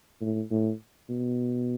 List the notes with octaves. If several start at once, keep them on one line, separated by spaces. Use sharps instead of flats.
A2
A2
B2